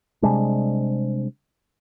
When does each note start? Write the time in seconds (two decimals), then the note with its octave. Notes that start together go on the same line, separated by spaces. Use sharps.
0.22 C3 G3 G#3 D4